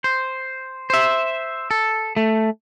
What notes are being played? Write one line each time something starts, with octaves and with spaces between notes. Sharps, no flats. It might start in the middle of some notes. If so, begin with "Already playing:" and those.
C5
C5 E5
A4
A3